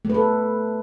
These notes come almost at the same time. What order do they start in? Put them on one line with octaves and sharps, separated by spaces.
A3 B4 A4